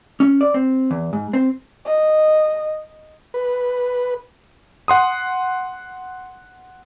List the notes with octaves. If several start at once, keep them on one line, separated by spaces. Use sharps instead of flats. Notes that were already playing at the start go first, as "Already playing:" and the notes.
C#4
D5
C4
E2
G#2
C4
D#5
B4
F#5 C6 D#6